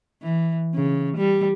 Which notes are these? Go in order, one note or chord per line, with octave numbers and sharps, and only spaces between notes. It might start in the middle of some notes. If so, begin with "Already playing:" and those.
E3
C#3
G3